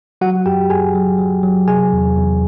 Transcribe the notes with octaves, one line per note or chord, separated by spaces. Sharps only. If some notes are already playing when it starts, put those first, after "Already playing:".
F#3 F#4 F#5
F#2 G4 G5
F#2 G#4 G#5
F#3
F#3
F#3
C3 G#4 G#5
E2
E2